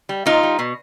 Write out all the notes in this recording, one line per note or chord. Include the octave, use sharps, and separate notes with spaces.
G3
A#2 D#4 F4
G3
B2